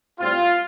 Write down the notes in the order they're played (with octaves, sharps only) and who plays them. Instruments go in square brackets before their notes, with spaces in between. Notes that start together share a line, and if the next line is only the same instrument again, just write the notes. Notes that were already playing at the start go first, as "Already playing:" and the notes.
[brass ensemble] A2 G3 C4 F4